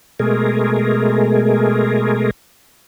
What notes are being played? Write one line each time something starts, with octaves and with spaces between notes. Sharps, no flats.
B2 G#3 A3 G#4 A#4